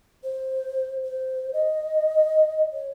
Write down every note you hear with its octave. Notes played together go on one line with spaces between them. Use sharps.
C5
C5
D#5
C#5